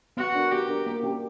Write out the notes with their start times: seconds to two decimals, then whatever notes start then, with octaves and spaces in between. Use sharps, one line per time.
0.17 B3 F#4
0.35 D4 A#4
0.51 B3 G4
0.69 D4 A#4
0.86 A#3
1.03 C#4 G4